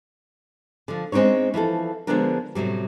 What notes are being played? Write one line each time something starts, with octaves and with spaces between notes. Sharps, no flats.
D3 F3
G#3 C4 D4 D#4 C#5
E3 F3 E4 A4
D3 F3 G#3 B3 D4 A#4
A2 C3 F#3 G3